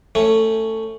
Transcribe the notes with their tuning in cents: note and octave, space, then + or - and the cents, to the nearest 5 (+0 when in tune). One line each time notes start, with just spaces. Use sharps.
A3 +15 C#4 +0